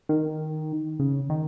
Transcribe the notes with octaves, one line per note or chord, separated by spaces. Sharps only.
D#3
C#3
D#3